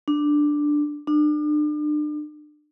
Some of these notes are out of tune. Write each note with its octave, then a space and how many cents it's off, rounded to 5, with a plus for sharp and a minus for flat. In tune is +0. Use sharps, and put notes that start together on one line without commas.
D4 +5
D4 +35